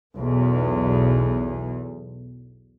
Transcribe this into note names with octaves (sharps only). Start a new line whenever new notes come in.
B1 E2